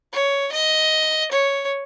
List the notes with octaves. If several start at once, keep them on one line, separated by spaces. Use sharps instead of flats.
C#5
D#5
C#5